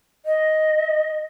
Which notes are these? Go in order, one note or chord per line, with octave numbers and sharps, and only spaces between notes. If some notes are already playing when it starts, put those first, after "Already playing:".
D#5